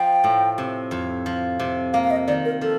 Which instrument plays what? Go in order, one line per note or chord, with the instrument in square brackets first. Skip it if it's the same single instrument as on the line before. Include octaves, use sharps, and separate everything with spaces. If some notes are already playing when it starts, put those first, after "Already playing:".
Already playing: [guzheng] F3 [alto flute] G5
[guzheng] A2
C3
F2
F3
C3
[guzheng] A#3 [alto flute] F5
[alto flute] F5
D#5
[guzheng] D#3 [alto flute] D5
[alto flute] A#4
[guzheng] F3 [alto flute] A4